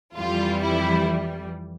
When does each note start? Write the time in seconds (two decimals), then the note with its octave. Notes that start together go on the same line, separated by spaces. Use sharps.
0.15 F2 E3 G3 F4
0.62 E4